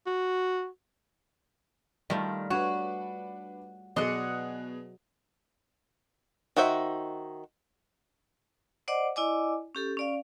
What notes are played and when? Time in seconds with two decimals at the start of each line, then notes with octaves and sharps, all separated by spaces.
0.07 F#4
2.10 D#3 G3 A3 F4
2.50 D4 F#4 B4 C#5
3.96 B2 F#3 G#4 D5 D#5 F#5 C6
6.56 D#3 D#4 F#4 C5 E5
8.88 C5 D5 D#5 F#5 D6
9.16 E4 D5 D#5 G#5 D6
9.75 C#4 G4 A4
9.97 C#4 D5 F5